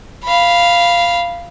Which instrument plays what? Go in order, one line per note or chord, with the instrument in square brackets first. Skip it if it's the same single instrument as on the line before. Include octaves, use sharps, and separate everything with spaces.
[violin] F5 B5